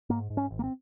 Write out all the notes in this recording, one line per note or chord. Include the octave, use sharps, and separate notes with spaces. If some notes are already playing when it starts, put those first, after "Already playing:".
G#2 A#3
G#2
C#4
G#1
A#3
C4